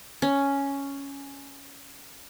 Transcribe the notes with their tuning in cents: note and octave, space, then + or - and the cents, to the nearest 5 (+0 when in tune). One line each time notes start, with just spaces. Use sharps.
C#4 +5